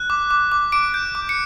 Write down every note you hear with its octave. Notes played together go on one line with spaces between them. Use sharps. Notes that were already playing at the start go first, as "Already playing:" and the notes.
Already playing: F#6
D6
D6
D6
D6 D7
G6
D6
C#7